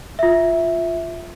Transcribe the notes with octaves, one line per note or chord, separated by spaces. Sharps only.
F4 E5